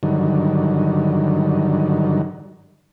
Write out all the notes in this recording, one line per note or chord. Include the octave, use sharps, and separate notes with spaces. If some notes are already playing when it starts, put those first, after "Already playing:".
G2 D3 D#3 F#3